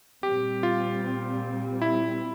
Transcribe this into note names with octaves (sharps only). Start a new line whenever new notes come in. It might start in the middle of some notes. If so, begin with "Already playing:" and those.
A#2 G3 C4 G4
F4
E4